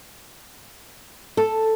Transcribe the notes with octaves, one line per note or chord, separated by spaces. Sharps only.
A4